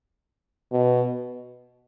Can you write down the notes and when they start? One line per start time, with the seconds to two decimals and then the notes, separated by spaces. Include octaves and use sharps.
0.72 B2